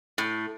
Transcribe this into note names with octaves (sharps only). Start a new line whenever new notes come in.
A2